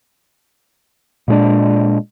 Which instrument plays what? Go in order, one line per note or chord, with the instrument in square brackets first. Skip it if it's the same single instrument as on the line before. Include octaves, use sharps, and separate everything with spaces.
[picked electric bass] A#2 G#3 C#4 D4